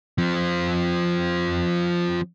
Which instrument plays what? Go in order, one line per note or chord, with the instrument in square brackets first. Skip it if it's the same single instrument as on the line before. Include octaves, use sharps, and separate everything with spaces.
[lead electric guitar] F3 C4